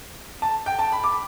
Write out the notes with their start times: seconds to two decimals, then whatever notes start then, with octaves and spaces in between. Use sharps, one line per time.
0.42 A5
0.66 G5
0.79 A5
0.92 B5
1.04 D6